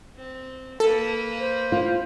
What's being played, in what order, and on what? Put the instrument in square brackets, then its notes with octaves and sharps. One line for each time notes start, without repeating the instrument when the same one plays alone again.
[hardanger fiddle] C4
[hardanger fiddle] A#3 B4 [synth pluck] A4
[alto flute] C5
[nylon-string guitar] F4